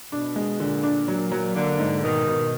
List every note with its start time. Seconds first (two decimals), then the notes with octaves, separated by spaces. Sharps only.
0.12 B2 D4
0.36 G#3
0.60 A#2 D3
0.83 D4
1.08 F#3
1.32 F#3
1.55 D3 A#3
1.79 G#2
2.03 B2 D#3
2.27 B2